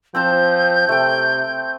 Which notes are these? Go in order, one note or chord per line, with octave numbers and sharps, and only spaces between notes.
F3 C4 C5 A5 G6
C3 A3 G5